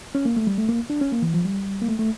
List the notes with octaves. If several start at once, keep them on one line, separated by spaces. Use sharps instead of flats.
C#4
A#3
A3
G3
A3
A#3
D4
C#4
A#3
E3
F3
G3
A#3
A3
A3